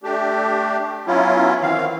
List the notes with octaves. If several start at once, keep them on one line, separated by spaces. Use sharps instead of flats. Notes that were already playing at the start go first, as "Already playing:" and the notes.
A3 D4 G4
F#3 B3 C#4 E4 F4
D#3 E3 C4 F5